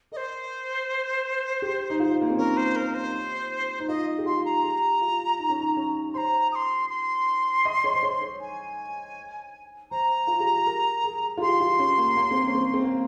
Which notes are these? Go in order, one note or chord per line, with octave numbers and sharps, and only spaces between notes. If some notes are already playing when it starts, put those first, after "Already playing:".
A#4 D#5
C5
G4
D#4
F4
A#3
C4
C#4 A#4
C5
A#4
C5
D#4
F4 D#5
G4
F4 C6
A#5
G4
F4
D#4
C#4
D#4
C#4
C5 A#5 C6
D#6
C6
C6
D#5
C#5
C5
C#5
C#5
G#5
C5 A#5
F4
G4
G#4
A#4
G#4
F4
G4 C6
F4
C#4
A#3
A#3
C4
A#3
C#4
C4
C4
A#3